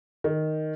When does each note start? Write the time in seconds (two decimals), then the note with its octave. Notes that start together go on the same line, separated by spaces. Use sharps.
0.24 D#3